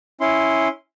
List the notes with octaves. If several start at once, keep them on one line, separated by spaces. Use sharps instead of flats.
C#4 E4 C6